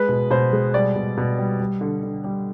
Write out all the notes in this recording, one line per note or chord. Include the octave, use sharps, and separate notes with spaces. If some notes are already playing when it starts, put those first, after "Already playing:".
Already playing: G#3 B4
B2
B2 C5
G#3
G3 D5
B2
B2
G3
G3
D3
D3
G3